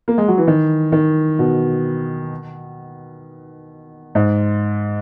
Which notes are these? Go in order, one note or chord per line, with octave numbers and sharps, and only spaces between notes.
A#3
G#3
F#3
E3
D#3
D#3
B2
G#2